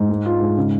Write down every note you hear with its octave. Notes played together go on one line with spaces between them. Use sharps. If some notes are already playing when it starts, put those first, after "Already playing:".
Already playing: G#2
G#3
F4
G#2
C#3